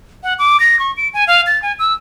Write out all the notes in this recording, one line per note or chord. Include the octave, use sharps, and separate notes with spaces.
F#5
D6
A#6
C#6
D7
G#5
F5
A6
G#5
E6